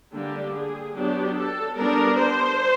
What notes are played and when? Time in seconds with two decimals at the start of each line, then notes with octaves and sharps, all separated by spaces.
0.13 D3 G3 A#3 D4 G4
0.54 G#4
0.95 F#3 B3 D4 G4
1.36 A4
1.77 G3 B3 D4 A#4
2.19 C5